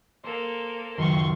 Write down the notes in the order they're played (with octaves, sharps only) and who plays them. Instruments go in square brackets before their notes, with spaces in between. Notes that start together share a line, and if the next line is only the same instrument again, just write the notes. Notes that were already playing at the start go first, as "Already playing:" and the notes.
[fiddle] A#3 A4 [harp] C5
[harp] C#2 F#2 D#3 [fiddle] C6 C#6